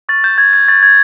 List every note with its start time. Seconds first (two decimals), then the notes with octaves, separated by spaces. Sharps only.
0.09 C#6 F6 A6
0.24 G6
0.38 G#6
0.53 G#6
0.68 C#6 F6 A6
0.83 G#6